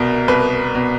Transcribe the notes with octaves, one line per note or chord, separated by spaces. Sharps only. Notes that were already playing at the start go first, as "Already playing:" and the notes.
Already playing: C2 B2 A#4
C2 B4
B2